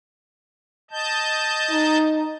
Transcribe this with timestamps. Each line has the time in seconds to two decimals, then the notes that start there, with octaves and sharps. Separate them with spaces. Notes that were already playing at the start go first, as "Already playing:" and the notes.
0.91 D#5 A5 G6
1.71 D#4